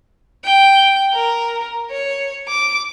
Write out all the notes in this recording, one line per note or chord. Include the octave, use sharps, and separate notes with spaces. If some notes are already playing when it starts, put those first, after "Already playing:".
G5
A#4
C#5
D6